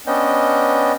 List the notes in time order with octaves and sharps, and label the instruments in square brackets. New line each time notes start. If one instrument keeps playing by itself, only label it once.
[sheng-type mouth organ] B3 C#4 D4 D#5 G5